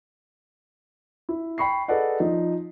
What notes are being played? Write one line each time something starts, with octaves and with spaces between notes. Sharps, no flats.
E4
G5 B5 C#6 C7
G#4 A4 B4 D5 D#5 F#5
F3 D#4